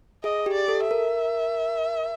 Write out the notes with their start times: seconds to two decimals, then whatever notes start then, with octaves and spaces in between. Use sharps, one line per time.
0.24 G#4 D#5
0.46 G4
0.54 D5
0.68 A4
0.83 E5
0.91 A#4